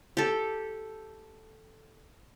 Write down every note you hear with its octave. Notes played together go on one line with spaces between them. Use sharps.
G4 A4